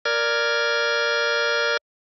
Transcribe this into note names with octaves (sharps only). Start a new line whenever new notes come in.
A#4 D5 F6 G#6